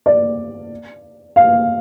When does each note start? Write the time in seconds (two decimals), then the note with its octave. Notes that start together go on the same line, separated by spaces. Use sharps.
0.06 D5
1.36 F5